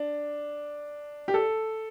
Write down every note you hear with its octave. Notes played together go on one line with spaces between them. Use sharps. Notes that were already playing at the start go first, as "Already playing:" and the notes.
Already playing: D4
G4
A4